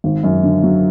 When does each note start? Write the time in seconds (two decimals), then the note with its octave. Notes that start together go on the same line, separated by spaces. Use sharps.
0.04 G#1
0.23 F#2
0.44 D3
0.63 F#3